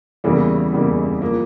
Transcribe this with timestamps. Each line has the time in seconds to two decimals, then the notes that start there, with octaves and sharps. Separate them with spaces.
0.24 E2 C#3 E3 G3 A#3
0.73 E2 C#3 E3 G3 A#3
1.21 F3 A#3